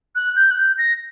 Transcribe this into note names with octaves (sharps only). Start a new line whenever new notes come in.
F#6
G6
F#6
G6
A#6